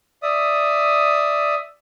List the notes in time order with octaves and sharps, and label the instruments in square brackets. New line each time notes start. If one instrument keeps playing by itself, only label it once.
[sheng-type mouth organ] D5 E5 D#6